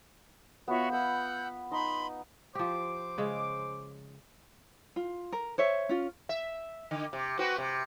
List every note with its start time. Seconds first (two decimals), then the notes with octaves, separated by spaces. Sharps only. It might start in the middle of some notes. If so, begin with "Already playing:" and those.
0.68 B3 F4 F#4 C#5 E5
0.90 B4 E5 F#5 E6 G6
1.72 D#4 B5 C6
2.55 F3 G4 C5 D6
3.18 C#3 G#3 C#4
4.96 F4
5.32 A#4
5.58 C5 C#5 E5
5.89 C#4 F4
6.29 E5
6.91 D3
7.13 C3
7.38 C4 F#4 B4
7.58 C3